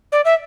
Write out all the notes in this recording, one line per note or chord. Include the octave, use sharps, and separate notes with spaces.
D5
E5